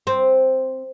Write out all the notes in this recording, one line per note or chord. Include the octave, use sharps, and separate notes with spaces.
C4